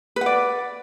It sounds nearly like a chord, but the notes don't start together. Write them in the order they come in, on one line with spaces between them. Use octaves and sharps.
B4 F#5 D5